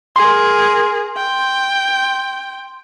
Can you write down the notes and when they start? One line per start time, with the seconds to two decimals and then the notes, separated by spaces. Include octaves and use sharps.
0.16 G#4 A#4 C6
1.16 G5